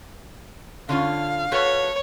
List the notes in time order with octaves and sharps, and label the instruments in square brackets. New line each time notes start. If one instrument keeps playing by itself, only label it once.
[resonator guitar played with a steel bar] D3 C#4 F4 [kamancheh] F5
[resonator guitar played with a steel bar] F#4 A4 B4 [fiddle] C#5